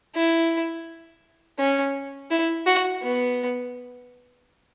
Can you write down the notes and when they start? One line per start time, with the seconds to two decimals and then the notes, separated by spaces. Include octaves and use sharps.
0.16 E4
1.58 C#4
2.31 E4
2.66 F#4
3.02 B3